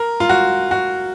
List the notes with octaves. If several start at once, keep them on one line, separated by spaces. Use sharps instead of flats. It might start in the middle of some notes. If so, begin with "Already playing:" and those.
Already playing: A#4
F4
F#4
F#4